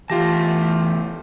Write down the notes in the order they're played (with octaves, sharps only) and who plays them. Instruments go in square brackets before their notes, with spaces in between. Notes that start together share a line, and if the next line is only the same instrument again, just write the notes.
[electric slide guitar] E2 A3 A5 [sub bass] E3 [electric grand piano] F4 G4 A#6